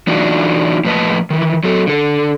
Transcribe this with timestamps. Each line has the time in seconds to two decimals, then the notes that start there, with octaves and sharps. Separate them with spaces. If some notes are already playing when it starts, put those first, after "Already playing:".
0.07 E3 F#3 D4 D#4 F4 F#4
0.85 A2 F3 B4 D#5 A5
1.30 D#3 E3
1.64 F#3 A4
1.87 D3 A4